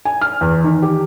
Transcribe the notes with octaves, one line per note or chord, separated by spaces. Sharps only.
G#5
F6
E2
D#3
G4